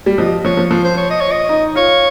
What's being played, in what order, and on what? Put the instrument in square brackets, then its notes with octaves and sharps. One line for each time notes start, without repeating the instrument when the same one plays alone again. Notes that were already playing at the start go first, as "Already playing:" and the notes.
[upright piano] G3
[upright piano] F3 [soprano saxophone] D#5
[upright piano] F3 [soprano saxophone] C#5
[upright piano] F3
[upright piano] F3 [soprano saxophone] C5
[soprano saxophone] C5
C#5
D#5
C#5
D#5
[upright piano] D#4
[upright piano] F4 [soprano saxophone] C#5